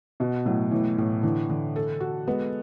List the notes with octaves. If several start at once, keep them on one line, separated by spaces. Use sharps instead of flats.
B2 F#4
A2 F#3
A2 E3
A2
D3 E3
D3
A4
F#4
G#3 B3